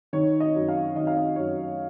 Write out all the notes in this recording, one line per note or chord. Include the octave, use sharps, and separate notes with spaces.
D#3 C#5
D#5
F#2
F5
D#3 D#5
F5
D#5
F#2 C#5